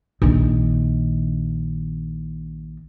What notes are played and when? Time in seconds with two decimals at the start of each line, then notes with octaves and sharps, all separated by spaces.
0.22 A#1 D#3